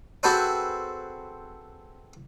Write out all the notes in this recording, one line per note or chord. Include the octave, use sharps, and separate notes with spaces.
C4 F#4 G#4 A4 B4 C5